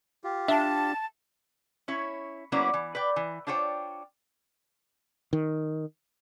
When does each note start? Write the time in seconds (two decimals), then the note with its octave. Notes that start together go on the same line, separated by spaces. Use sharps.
0.24 F4 G4
0.48 D4 E5 A5
1.88 C#4 E4 C#5
2.52 F#3 A#3 B3 C#4 E4 D5
2.74 E3
2.95 B4 D5 G5
3.16 E3
3.47 D4 F4 C5 C#5 G5
5.33 D#3